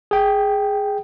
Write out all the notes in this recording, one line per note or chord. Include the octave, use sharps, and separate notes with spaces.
G#4 G5